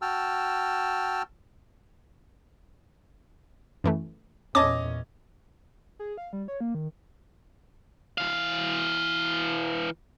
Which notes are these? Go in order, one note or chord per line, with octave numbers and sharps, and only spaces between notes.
F#4 G5 A5 E6 F6
F#2 E3 A3
E2 A#2 C#4 D#5 G#5 A5 D6 D#6
G#4
F5
G3
C#5
A#3
D#3
E3 F5